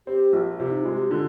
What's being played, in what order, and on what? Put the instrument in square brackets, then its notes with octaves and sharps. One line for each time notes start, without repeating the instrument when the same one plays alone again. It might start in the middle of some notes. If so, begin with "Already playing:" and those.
[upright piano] C4 [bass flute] G4
[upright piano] A#1 [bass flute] F4
[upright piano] C3 [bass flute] F4
[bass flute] D#4
[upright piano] G#3 [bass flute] F4
[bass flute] G4
[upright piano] D3 [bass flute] F4